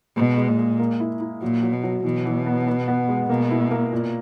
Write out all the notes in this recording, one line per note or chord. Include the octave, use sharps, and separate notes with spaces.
B2 G#3
G#3
A#2
G#3
A#3
E4
E4
A#2 F#3
F#3
B2
F#3
B2 E3
E3
B3
B3
B3
G#3
B2 A#3
E4
A#3
A#2